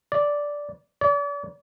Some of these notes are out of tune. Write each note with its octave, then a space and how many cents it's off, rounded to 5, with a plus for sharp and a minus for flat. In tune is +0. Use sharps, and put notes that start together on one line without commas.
D5 -5
D5 -40